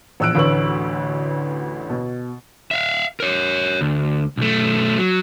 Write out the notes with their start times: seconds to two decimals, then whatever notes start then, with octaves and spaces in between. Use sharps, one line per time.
0.20 A#1 E2 E6 F#6 D7
0.35 A1 D2 D3 B4 C#6 F#7
1.89 B2
2.71 E5 F5
3.20 A#4 C#5
3.81 D2
4.37 B1 A3
4.98 F#3